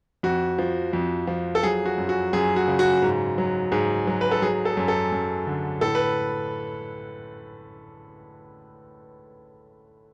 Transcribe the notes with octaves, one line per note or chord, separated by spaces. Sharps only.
F2 F#4
F3
F2
F3
A4
F#3 G#4
F#4
F#2
F#4
F#2 G#4
F#4
C#3
F#4
G#2
F#3
G#2 G#4
F#3
B4
A4
F#3 G#4
A4
F#2
A4
F#2
D3
A2 A4
B4